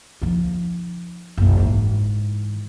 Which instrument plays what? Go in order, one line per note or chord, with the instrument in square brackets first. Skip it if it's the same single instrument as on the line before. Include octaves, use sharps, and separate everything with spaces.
[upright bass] F3 D#4
F#1 B1
G#2 E3